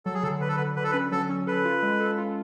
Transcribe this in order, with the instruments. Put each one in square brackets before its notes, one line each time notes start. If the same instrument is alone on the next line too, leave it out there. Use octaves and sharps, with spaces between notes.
[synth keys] F#3 [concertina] A4
[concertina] G#4
[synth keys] D3 [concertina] A4
[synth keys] D3 [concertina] B4
[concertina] A4
[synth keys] D3 [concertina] B4
[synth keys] D3 [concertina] B4
[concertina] A4
B4
[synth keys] C#4
[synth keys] F#3 [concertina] A4
[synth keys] C#4
[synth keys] A4 [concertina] B4
[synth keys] F4
G#3
A4
F4